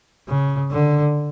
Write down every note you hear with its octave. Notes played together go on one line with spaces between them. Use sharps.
C#3
D3